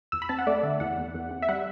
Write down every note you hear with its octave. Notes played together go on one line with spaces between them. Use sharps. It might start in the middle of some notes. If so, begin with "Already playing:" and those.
E2 E6
B5
C4 A5
F#5
A3 D5
D3 E5
E2 F#5
E2
E2
C4
E5
G3 F#5